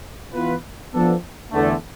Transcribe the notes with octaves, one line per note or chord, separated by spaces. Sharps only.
E3 B3 F4 B4
F3 B3 D4 A4
E2 D3 A3